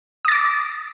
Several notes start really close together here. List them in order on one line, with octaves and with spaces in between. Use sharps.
D#6 A6 D6